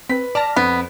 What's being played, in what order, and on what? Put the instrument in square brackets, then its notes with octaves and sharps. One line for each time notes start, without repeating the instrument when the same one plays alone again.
[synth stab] C4 [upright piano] B4 B6
[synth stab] D5 F6 A#6 [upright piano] A5
[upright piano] F2 [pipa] B3